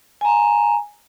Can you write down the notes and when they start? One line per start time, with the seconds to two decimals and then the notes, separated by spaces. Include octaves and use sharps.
0.21 G#5 A#5